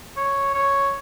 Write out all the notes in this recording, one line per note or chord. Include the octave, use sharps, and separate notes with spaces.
C#5
C#5